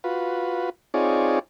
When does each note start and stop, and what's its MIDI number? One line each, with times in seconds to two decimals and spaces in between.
0.04 0.70 65
0.04 0.70 66
0.04 0.70 71
0.94 1.39 60
0.94 1.39 63
0.94 1.39 65
0.94 1.39 68
0.94 1.39 73
0.94 1.39 74